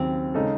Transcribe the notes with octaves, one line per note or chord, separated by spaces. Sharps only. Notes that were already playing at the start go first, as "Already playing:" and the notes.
Already playing: D#2 C#3 F#3 C4
C#3 G#3 D#4 A4